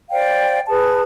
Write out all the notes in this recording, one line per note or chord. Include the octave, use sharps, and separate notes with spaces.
C5 D5 F5 G5
G#4 B4 A5